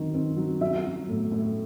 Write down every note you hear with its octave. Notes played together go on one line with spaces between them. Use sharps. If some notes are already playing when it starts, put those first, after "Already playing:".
Already playing: D#3 F#3 C4
C4
F#3
F#3 E5
F#3
A2
A2